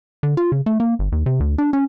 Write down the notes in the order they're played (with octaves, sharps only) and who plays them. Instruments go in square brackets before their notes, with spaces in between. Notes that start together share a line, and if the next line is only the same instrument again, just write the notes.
[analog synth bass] D3
F4
C#3
A3
A#3
G1
D#2
C3
D2
D4
C#4